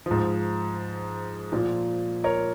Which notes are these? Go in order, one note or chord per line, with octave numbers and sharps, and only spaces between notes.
G#2 F3
A#2 F3
A#4 C#5